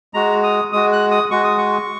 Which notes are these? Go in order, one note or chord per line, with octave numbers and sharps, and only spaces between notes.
G#3 F#4 A#5
D#6
G#3 F#4 D#6
F#6
D#6
G#3 F#4 C#6
D#6
C#6